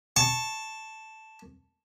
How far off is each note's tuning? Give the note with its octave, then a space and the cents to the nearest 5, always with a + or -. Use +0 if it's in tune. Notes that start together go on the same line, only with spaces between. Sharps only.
A5 +0 C#6 -10